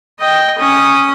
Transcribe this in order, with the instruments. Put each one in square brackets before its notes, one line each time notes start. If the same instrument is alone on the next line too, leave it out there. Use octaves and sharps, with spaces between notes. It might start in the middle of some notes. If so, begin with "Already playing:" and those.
[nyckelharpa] D#5 G5
C#4 D#6